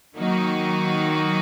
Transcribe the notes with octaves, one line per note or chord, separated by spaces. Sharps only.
D#3 F#3 A#3 D#4 F#4